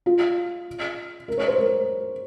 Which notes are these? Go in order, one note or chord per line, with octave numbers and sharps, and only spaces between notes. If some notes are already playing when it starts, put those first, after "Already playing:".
F4
A#4
C#5
C5
A#4